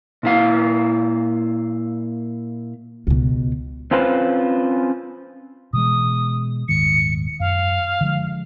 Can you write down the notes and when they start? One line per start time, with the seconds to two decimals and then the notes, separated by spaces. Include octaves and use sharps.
0.23 A#2 E4 F5
3.07 C#2 B2
3.91 C4 C#4 F4 B4 C5
5.73 B2 E3 G#3 D#6
6.69 D#1 G#2 D#3 C#7
7.40 F#2 F5
8.01 D3 F3 G#3